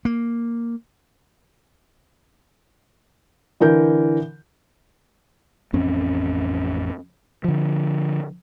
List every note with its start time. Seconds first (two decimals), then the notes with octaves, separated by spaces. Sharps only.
0.05 A#3
3.60 D3 E3 A#4 G6
5.73 A1 F2 C4 C#4
7.44 D3 F3